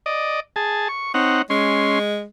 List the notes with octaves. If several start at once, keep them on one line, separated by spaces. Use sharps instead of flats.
D5 D#5
G#4 A5
C#6
C4 D#4 C#5 F#5
G#3 C#4 C6